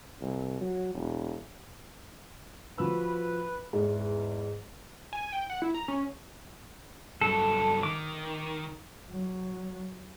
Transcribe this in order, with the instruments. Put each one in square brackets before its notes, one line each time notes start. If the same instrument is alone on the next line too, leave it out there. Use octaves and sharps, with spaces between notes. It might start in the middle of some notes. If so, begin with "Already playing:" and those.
[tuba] C2
F#3
E1
[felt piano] F3 F#4 E6 [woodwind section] B4
[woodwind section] E2 [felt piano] G#2
[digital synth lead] G#5
G5
F#5
E4
A#5
C#4
[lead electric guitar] G2 F#3 [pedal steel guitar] A4
[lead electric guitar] D#3 [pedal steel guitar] D6
[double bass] F#3